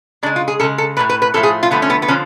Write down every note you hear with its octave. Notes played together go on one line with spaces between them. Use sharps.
C#3 G#3 D4
F4
G#4
C#3 G#3 A4
A4
A2 F3 A3 B4
B4
B4
A2 F3 A3 A4
G#4
F4
D3 F3 A3 B3
C#4
B3
B3
D3 F3 C#4